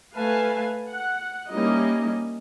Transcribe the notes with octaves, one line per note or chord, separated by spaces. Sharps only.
A3 B4 F5 G#5 A5
F#5
G3 A#3 C#4 D#4 E4 D#5